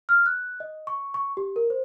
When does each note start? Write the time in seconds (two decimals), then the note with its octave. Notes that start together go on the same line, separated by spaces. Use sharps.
0.09 F6
0.26 F#6
0.60 D#5
0.87 C#6
1.14 C#6
1.37 G4
1.56 A#4
1.70 C5